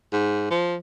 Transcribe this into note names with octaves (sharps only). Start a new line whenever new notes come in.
G#2
F3